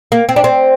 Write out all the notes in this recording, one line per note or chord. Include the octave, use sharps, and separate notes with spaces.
A#3
C4
D4
C4